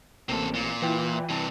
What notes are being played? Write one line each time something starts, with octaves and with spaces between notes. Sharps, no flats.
A1 C3 A#3 C4 A4
A#2
E3 F4 B4 G5
G2 C3 E3 A5